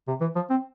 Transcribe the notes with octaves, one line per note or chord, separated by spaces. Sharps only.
C3
E3
F3
C4